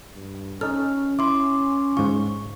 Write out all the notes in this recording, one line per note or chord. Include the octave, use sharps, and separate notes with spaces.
G2
C#4 D#4 A4 F6
E4 C6 D6
G#2 F4 C#6